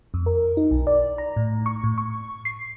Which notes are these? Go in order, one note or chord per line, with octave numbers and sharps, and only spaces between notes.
F2
A#4
D#4
B1
D5
A#5
A2
C#6
A2
C#6
C7